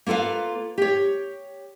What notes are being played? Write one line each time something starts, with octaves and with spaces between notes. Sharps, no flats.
A#3 F4 A4 B4 F5
G4 C#5